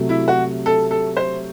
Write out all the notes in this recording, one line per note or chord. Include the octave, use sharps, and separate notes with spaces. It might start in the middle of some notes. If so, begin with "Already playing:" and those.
Already playing: C3 F#3 A3
E4
F#4
A4
A4
C5